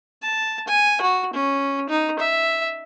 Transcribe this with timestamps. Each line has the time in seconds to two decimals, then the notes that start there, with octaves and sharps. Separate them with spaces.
0.22 A5
0.68 G#5
1.01 F#4
1.33 C#4
1.89 D#4
2.19 E5